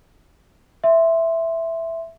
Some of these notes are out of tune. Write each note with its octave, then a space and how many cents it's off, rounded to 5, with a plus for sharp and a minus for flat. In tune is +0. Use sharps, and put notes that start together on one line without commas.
E5 +0 C6 +0